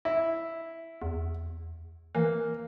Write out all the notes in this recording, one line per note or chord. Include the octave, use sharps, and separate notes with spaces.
E4
E2
E3 A#3